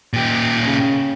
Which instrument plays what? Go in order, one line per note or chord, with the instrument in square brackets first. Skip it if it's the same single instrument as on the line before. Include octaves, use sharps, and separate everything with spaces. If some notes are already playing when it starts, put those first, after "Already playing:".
[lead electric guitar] A#2 G4
[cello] C#3 C#4